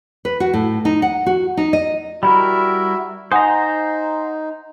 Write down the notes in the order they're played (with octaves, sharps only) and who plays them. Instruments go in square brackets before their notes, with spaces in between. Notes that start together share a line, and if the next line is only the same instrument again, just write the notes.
[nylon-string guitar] B4
F#4
A2
D#4
F#5
F#4
D#4
D#5
[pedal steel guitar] G3 E4 A#4 [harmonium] F#4 E5 [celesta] B5
[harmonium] D#4 [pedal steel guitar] C5 A#5 [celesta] F#5 G#5 D#6